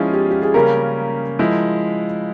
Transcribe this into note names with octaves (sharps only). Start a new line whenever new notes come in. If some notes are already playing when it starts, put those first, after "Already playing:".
Already playing: F3 G#3 C#4 E4 F4 G#4
G4
G4
G#4
C#3 G3 A#3 C#4 A#4
F3 G#3 E4